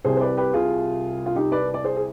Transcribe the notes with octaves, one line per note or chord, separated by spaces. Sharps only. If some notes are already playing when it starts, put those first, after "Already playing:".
C2 C3 G3 G#4 C5
C5
B4 D5
G4 B4
F4 G#4
F4
D#4 G4
B4 D5
D5
G#4 C5
G#4